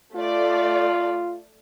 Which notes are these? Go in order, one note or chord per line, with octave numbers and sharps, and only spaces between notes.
A3 F4 D5